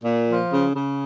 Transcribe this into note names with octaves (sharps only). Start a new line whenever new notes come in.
A#2
F3
C#3
C#3